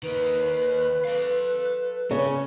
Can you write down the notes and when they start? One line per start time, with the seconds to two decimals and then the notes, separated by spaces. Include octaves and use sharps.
0.03 D#3 A#3 B4
1.05 A4 F5
2.11 C#3 C#4